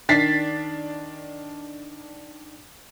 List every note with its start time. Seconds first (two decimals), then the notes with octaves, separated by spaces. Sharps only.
0.09 D#3 D4 A6 B6 C7